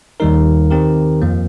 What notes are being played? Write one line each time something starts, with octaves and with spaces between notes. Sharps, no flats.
D#2 D#3 G3 D#4 A#4
D#3 C4 G4 A#4
F2 F3 A#3